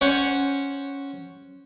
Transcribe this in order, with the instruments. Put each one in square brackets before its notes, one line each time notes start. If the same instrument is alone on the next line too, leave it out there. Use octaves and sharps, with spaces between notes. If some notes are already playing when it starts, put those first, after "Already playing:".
[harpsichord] C#4 C5 C#5 F#5 G#5